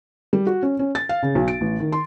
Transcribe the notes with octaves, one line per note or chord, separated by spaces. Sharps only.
G3
F#4
C#4
C#4
A6
F5
C#3
B1
D7
A1
D#3
C6